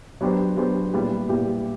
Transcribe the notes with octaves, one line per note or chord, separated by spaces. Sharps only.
F#3 B3 D4 G4 C5
F#3 B3 D4 G4 C5
A#2 G3 B3 E4 G4
A#2 G3 B3 E4 G4